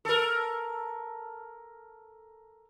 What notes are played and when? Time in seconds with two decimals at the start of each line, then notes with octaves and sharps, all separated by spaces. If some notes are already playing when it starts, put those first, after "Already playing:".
0.05 A4 A#4